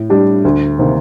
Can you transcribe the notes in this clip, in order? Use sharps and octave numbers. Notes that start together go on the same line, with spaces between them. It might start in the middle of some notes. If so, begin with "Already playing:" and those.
Already playing: A2
G3 D4 G4
D2
C3 D#3 A#3